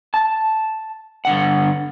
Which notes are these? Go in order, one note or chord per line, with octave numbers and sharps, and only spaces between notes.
A5
G2 D3 F#5